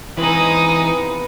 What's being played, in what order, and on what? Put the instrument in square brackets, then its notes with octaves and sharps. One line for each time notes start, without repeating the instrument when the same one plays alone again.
[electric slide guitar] E3 B4 [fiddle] G#3 D#4 [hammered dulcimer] B3 C4 F5
[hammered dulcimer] C3 B3